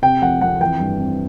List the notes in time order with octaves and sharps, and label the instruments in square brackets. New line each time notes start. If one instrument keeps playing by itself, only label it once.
[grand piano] C3 G5
F2 F#5
F2 F#5
E3 G5
G2
C4